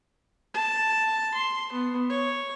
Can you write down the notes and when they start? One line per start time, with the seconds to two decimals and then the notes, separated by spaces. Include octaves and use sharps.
0.55 A5
1.34 C6
1.73 B3
2.10 C#5